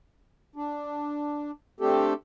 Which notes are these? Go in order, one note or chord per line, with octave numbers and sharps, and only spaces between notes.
D4
A3 C4 D4 G4 A4